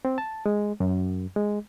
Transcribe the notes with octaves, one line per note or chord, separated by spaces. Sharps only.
C4
A5
G#3
F#2
G#3